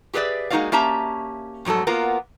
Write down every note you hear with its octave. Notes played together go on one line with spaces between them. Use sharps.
G4 G#4 B4 C#5 D5 E5
G#3 A#3 D#4 F#4 D5 F5
A#3 C#4 G4 E5 A5 A#5
F2 G#2 F#3 A3 A4
A#3 B3 F4 A#4